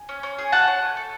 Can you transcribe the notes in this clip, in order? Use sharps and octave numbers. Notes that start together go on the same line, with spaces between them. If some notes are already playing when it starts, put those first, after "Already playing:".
Already playing: G#5
C#4
C#4
G#4
F#4 F#5 A5
C#4
A3
A4